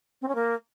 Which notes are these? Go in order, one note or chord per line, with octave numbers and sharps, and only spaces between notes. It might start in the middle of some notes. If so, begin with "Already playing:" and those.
C4
C#4
A#3